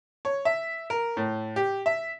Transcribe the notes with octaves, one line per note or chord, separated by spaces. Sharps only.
C#5
E5
A#4
A2
G4
E5